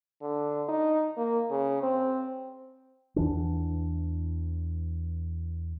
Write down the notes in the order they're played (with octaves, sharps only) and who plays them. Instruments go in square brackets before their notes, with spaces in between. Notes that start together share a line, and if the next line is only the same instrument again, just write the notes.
[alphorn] D3
D#4
A#3
C#3
C4
[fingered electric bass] E2 E3 D4